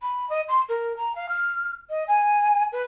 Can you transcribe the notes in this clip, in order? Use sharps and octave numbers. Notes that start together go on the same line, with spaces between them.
B5
D#5
C6
A#4
A#5
F5
F6
D#5
G#5
B4